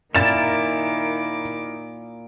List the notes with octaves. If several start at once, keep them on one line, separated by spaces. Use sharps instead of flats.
A#2 D#3 E4 A#4 D6 A6 E7